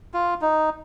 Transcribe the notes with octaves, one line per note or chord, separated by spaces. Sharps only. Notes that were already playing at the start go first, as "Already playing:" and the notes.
F4
D#4